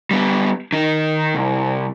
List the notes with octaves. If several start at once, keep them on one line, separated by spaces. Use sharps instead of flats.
G3 B3
D#3 D#4
C2